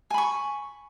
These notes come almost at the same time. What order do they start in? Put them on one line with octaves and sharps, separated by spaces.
G#5 B5 C#6